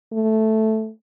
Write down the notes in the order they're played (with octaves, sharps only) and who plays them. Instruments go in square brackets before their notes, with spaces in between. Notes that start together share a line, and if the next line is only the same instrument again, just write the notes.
[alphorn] A3